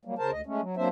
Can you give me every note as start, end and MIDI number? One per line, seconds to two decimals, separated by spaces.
0.05 0.14 54
0.05 0.14 55
0.05 0.14 58
0.19 0.31 49
0.19 0.31 70
0.19 0.31 72
0.19 0.31 81
0.32 0.41 38
0.32 0.41 75
0.46 0.61 56
0.46 0.61 57
0.46 0.61 61
0.61 0.76 54
0.77 0.89 54
0.77 0.89 58
0.77 0.89 60
0.77 0.89 62
0.77 0.89 72
0.77 0.89 76